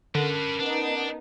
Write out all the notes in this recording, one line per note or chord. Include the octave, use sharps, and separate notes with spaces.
D3 C#4 D4 A#4 B4 A5
B3 D4 D#4